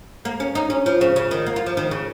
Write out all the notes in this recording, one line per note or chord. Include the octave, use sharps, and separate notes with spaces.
A#3
C#4
D#4
C#4
F3
C#3
C#3
D#3
A#3
F4
F3
D#3
C#3